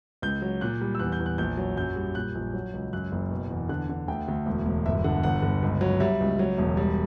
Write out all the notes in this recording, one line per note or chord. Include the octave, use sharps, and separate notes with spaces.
C#2 G6
F#3
A#2 F#6
G3
E6
E2 F#6
G6
E2
F#6
A#1 G6
F#3
F#2 G6
G3
A#2 F#6
A#1
F#3
C#2
F#2 F#6
F#1
B2
E2
D3 F#6
D3
D2 G5
D2
E1
E1
G1 E5
D3 F#5
G1 F#5
G1
C#2
F#3
G3 E5
C#2
F#3
E1
G3